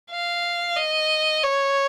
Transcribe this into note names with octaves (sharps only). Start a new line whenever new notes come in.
F5
D#5
C#5